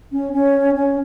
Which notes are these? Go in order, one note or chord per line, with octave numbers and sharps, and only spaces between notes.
C#4
C#4
C#4